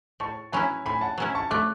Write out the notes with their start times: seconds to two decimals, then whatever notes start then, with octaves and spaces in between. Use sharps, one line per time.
0.20 A2 A5 C#6
0.52 F#3 C#4 E4 G#5 B5
0.86 A2 G#5 B5
1.01 F#5 A5
1.18 F#3 C#4 E4
1.35 A5 C#6
1.51 A3 D6 F#6